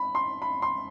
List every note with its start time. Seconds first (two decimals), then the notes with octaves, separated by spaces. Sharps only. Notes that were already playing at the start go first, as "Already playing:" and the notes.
Already playing: B5
0.15 C6
0.42 B5
0.62 C6